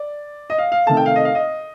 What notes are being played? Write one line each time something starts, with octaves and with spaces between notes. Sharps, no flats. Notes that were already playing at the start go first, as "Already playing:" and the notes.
Already playing: D5
D#5
F5
F5
C3 D#3 A3 A5
G5
F5
D#5
F5
D#5